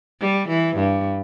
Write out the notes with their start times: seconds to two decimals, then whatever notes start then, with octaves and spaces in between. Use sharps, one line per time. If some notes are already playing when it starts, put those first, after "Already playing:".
0.21 G3
0.48 E3
0.76 G2